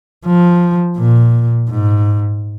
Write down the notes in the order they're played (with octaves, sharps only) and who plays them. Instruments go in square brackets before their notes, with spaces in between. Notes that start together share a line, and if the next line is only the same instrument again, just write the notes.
[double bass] F3
A#2
G#2